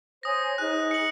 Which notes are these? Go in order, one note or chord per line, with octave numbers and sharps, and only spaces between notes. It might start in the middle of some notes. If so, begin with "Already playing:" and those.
C5 C#5 G#5 D#6 A#6
D#4 G#4 C5 F#6
C#7 F#7